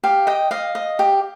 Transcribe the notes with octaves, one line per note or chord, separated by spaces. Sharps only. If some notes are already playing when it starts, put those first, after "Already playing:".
G4 F5
D#5 G5
D#5 F5
D#5
G4